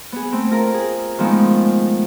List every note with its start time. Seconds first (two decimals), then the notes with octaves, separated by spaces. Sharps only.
0.12 B3 G#4
0.32 A3 C4
0.51 F4 A#4 A#5
0.74 G#4
1.19 D#3 F3 G#3 A3 B3 F4